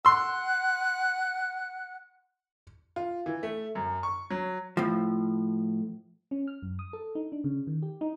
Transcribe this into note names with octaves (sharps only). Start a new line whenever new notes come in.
F#5 C6 E6 F#6
F4
E3
A3
F#2
C#6
F#3
A2 F3
C#4
F6
F#2
D#6
A4
D#4
D4
C#3
D#3
G4
D#4